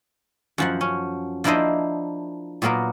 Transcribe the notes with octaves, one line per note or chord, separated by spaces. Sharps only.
F#2 F3 F#5
C#4
F3 A#3 D4 E4 C5 D#5
A#2 F#3 A#3 B3 A#4